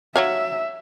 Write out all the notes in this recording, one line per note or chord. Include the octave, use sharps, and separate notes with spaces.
F#3 C#5 E5 F5